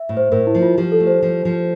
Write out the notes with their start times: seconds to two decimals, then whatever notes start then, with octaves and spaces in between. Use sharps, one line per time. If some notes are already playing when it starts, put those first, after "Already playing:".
Already playing: E5
0.09 A2
0.17 C5
0.32 A2 A#4
0.47 E4
0.55 F3
0.62 F4
0.78 F3 G4
0.92 A4
1.00 A3
1.07 C5
1.22 F3
1.45 F3